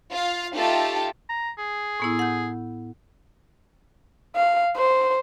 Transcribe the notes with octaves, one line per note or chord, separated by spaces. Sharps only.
F4 F5
A3 D#4 F4 G4 A4
A#5
G#4
A2 B3 E4
F#5 G6
F5
C5